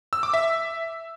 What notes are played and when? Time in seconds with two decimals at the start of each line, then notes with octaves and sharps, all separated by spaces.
0.13 E6
0.23 D6
0.34 E5